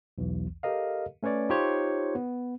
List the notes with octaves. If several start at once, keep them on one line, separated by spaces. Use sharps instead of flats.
B1 E2 E3
G4 A4 A#4 D#5 F5
A3 C#4 B4 C#5 D5
D#4 F4 G4 C5 C#5
B3